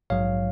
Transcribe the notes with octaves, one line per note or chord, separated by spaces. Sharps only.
A#1 G#2 F#3 C#5 F5